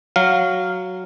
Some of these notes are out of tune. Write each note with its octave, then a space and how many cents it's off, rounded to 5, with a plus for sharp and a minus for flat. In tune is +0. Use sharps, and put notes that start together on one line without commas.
F#3 +0 F5 +0